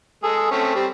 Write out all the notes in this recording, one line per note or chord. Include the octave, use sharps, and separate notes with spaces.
G#3 G#4 A4
A3 C4 C#4
G3 C4